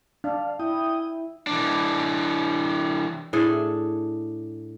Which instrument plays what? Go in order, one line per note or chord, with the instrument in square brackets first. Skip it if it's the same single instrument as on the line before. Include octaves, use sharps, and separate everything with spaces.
[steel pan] D4 [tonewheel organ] F5
[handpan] E4 [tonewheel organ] G5 D#6
[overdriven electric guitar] E3 D4
[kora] A2 D4 G#4 A4